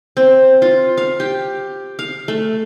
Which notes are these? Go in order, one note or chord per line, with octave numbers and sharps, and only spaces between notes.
C4
F4
F5
G4
F5
A3